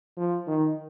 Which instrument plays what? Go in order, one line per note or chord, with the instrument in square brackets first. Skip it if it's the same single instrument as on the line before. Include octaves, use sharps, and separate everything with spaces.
[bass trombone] F3
D#3